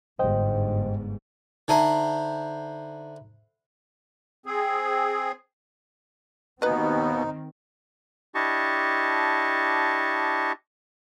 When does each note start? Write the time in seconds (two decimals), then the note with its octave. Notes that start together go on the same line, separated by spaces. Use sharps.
0.19 G1 G#2 C5 D#5 G5
1.68 D3 D#4 E4 C5 A5 A#5
4.46 C4 G#4
6.62 D#2 B2 D#3 B3 C4 D#4 B4 D#5
8.35 D4 E4 G4 D#5 A5 C#6